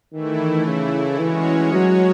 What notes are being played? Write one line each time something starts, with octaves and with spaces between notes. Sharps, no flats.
D#3 E3 A3 E4
C#3
E3 G#3 C#4 F#4 C#5
F#3